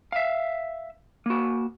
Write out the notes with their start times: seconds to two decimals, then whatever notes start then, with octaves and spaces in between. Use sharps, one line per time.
0.12 E5 F5
1.26 A#3 F#4